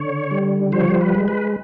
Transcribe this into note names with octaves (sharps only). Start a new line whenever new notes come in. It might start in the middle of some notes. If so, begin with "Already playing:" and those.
Already playing: D3 C#5
G3
F3 C5
C#5
C5
B4
G#3
B4